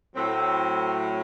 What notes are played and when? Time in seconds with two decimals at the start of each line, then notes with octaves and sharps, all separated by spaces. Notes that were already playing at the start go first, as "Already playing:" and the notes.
0.15 A2 F#3 C4